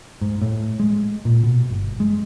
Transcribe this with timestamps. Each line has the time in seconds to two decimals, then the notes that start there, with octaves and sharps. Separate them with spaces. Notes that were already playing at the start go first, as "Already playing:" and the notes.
0.21 G#2
0.42 A2
0.80 G#3
1.25 A#2
1.44 B2
1.70 G1
2.00 G#3